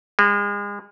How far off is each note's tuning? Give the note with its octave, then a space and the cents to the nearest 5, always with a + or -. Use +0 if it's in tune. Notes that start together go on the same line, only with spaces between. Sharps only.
G#3 -35